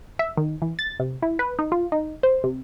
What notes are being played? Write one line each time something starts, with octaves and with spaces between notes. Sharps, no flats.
E5
D#3
E3
A6
C3
E4
B4
D#4
F4
D#4
C5
C3